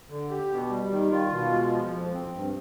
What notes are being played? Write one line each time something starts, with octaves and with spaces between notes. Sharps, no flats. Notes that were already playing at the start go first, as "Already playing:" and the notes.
D3
G4
B2
G3
D#3
F4
B2
G#3
F3
F2
C4
G2